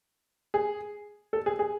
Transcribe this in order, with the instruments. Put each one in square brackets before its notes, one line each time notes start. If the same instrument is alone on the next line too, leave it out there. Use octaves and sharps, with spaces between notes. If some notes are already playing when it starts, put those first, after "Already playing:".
[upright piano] G#4
A4
G#4
G#4